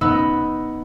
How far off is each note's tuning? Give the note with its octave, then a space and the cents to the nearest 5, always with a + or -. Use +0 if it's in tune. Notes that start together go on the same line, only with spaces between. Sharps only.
B3 +0 D#4 +5 E6 +0